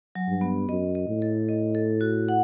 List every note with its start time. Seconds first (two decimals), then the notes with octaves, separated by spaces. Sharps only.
0.15 F#3
0.28 G2
0.41 B3
0.69 F#2 D#5
0.95 D#5
1.08 A2
1.22 A4
1.49 D#5
1.75 A4
2.01 F#4
2.28 F#5